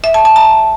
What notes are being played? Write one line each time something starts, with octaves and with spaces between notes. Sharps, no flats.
E5
A5
A5
A#5